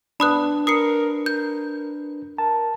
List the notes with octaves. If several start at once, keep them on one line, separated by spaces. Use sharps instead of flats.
B3 D4 B4 B5 D#6 F#6
A#4 D#6 C7 C#7
A#4 G6
A#4 A5